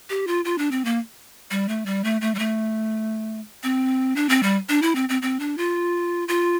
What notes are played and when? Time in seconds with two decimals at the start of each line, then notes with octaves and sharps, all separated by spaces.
0.10 G4
0.27 F4
0.45 F4
0.58 D4
0.71 C4
0.85 A#3
1.51 G3
1.68 A3
1.86 G3
2.04 A3
2.21 A3
2.35 G3
2.39 A3
3.63 C4
4.16 D4
4.29 C4
4.43 G3
4.69 D4
4.82 E4
4.95 C4
5.09 C4
5.22 C4
5.40 D4
5.58 F4
6.28 F4